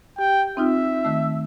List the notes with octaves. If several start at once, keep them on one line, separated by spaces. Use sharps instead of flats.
G4 G5
C4 D#4 F4 E5
D#3 A3